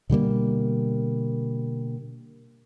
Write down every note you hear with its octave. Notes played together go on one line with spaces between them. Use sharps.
B2 D3 G3 A#3